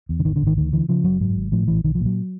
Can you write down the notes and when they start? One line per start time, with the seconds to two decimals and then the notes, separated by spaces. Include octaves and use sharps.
0.09 E2
0.20 D3
0.25 G#1 D#3
0.36 D3
0.42 G#1
0.47 D#3
0.57 D2 D#3
0.73 D3 E3
0.89 C#3 F3
1.04 F#1 F#3
1.20 G#2 F#3
1.36 G#1
1.52 A2 F3
1.68 A#1 E3
1.84 B1 D#3
1.95 F3
2.00 A#2
2.05 F#3